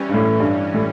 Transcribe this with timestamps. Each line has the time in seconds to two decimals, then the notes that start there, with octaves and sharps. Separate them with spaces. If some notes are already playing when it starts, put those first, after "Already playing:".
Already playing: E3 G3 C#4
0.09 G2
0.14 A2
0.40 G2
0.74 A2